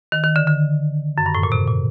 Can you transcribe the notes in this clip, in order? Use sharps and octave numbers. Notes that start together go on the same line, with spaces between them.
D#3
D#3
D3
D3
F#2
G2
A2
A#2
C3
A#2